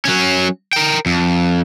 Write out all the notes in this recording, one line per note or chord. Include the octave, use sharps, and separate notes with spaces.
F#3 C#4
A#4 G5
F2